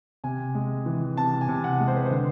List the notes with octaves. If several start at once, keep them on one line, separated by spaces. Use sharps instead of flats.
C3 G#5
G#3
E3
C3 A5
G#5
C3
F#5
G#3
C5
B4
C5
D3